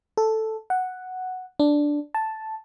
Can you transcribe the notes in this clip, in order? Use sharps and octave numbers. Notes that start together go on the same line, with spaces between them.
A4
F#5
D4
A5